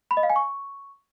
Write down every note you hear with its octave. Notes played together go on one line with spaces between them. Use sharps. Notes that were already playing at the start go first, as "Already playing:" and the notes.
B5
D#5
F5
G#5
C#6